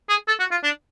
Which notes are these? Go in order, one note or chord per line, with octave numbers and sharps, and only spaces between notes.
G#4
A4
F#4
F4
D4